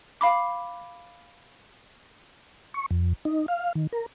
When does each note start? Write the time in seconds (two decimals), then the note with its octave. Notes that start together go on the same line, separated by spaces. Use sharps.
0.21 F5 B5 D6
2.74 C#6
2.91 F2
3.25 D#4
3.48 F5
3.75 D#3
3.93 A#4